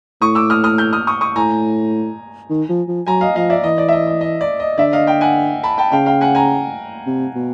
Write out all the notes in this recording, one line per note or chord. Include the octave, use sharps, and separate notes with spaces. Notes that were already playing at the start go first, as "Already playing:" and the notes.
A2 C#6 D#6
D6 E6
D#6 F6
D#6 F6
F6 G6
D#6 F6
C#6 D#6
C#6 D#6
A2 G#5 A#5
D#3
F3
F3
F#3 G#5 A#5
D#5 F5
F3 D#5 F5
D5 E5
E3 D#5
D5
E5
D#5
D#5
D#5
D5
D#5
D3 D5 E5
D#5 F5
F5 G5
F#5 G#5
A5 B5
G5 A5
C#3 F5 G5
F5 G5
F#5 G#5
G#5 A#5
C3
B2